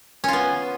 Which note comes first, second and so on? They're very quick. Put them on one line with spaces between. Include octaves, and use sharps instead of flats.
C#4 F4 B3